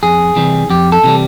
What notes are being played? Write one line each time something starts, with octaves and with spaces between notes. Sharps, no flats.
F2 G#4
C3 E3 G3
F2 G4
A4
C3 E3 G3